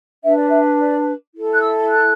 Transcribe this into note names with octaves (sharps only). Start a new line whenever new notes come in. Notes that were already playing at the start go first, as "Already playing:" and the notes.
D4 B4 E5
D5
E5
D5
E4 A4
F#6
E6
F#6